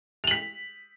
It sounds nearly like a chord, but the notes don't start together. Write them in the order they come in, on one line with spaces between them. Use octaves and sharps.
F7 F#7 B6